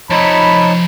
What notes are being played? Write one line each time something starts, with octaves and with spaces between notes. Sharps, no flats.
F3 D#4 C#5 E5 A5 B5